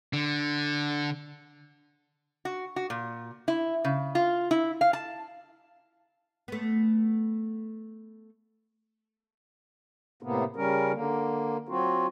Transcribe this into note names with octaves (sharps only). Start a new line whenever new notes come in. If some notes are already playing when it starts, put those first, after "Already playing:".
D3
F#4
F#4
A#2
E4
C#3
F4
E4
F5
A5
A3 B3
A2 C3 A#3 B3
C#3 G3 C#4 A#4
D3 A#3
F#3 C4 F4 F#4